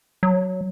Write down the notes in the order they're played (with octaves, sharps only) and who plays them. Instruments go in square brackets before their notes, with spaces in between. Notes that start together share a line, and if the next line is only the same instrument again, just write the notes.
[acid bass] F#3